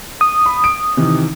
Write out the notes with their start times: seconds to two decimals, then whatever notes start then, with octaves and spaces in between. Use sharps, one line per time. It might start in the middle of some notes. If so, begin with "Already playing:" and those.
0.21 D#6
0.46 B5
0.64 D7
0.97 C3 D#3 E3